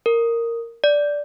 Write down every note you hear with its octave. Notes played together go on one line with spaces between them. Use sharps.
A#4
D5